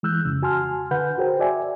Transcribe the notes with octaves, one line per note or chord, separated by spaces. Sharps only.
E3 G#3 E6 F#6 G6
F2 C#3
F#4 G#5 A5 C6 F6
D3 B4 F#5 B5 G6
F#4 G#4 A#4 C5 G5
F#4 D5 E5 G#5